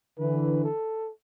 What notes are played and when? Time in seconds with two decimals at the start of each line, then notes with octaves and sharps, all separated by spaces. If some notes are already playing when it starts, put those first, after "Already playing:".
0.19 D3 E3 B4
0.64 A4